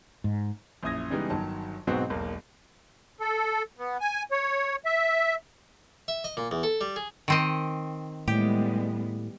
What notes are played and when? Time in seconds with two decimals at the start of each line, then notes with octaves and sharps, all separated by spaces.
0.24 G#2
0.83 A#1 F#2 E4 D#6 G#6 A#6
1.10 C#3 E3 G3 G#3 B3 D#4
1.30 G1 D#3 F#3 A5
1.87 G#2 B2 F#3 B3 C4 F#4
2.10 E1 B1 A#3
3.20 A4
3.78 B3
4.00 G#5
4.32 C#5
4.86 E5
6.08 E5
6.24 D#5
6.37 A#2
6.51 E2
6.63 A4
6.81 G3
6.96 G#4
7.28 D#3 C4 D#5
8.28 A2 G3 G#3 B3 G4